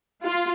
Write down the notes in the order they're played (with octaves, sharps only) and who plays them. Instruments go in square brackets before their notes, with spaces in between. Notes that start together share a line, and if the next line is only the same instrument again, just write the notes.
[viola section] F4